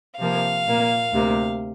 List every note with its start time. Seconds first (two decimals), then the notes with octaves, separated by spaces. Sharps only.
0.19 C3 F3 A#3 F5
0.66 A#2 A#3
1.13 D2 C3 A#3